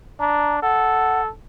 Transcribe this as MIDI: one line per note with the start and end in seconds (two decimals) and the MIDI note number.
0.20 0.59 62
0.20 0.56 82
0.62 1.29 69
0.62 1.21 78